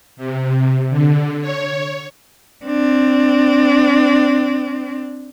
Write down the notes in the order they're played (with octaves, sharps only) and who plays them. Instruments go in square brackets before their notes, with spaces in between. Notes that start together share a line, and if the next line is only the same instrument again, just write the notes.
[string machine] C3
D3
C#5
[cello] C4 D4